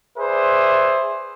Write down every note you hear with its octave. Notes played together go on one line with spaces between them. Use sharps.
G#4 B4 C5 D5 E5